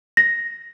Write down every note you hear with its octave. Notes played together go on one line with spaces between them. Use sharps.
A#6